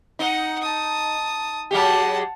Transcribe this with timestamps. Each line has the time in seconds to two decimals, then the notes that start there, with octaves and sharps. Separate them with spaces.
0.19 D#4 F#5
0.62 A5 D#6
1.71 F#3 G#3 G4 F#5 A5